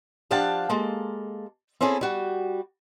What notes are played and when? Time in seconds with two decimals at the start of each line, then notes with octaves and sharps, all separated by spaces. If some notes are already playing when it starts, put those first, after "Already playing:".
0.31 F3 D4 G4 F5 F#5 A5
0.69 G#3 A#3 A4
1.81 C4 C#4 E4 G#4 A4
2.01 G3 F#4